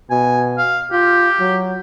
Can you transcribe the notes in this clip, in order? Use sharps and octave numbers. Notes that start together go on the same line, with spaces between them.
B2 G#5
F5
F4 G4
F#3